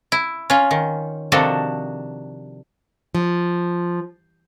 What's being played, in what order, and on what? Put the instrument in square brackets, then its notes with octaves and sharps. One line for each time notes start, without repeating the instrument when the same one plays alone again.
[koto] E4
C#4 F4
D#3
C3 D#3 F3 D4 F#4 A4
[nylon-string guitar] F3